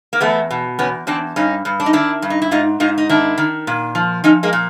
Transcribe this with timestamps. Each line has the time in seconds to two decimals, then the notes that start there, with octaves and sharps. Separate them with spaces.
0.13 A#3
0.21 E2 A3 B3
0.51 B2
0.79 E2 B3 C#4
1.07 E2 C4 D4
1.36 G2 C#4 D#4
1.65 G2
1.80 D4
1.86 D#4
1.93 D#3 D4 E4
2.22 G2
2.30 D#4
2.42 E4
2.51 G#2 D#4 F4
2.80 G#2 D#4 F4
2.98 D#4
3.09 D#3 D4 E4
3.38 D#3
3.67 A#2
3.95 F3
4.24 F3 C#4 D#4
4.43 G#3 A#3
4.53 A#2